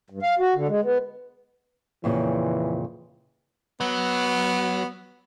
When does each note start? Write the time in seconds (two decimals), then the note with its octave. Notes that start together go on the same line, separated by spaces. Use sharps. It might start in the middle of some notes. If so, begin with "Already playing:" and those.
0.10 G2
0.22 F5
0.39 F#4
0.55 D3
0.68 G#3
0.83 B3
2.04 F2 A#2 C#3 E3
3.80 F#3 B3